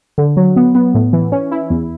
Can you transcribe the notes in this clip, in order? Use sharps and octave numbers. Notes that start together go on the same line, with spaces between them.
D3
F#3
B3
B3
A2
E3
C#4
E4
E2